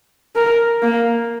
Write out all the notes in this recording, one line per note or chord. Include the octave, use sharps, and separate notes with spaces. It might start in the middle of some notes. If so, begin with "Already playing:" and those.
A#4
A#3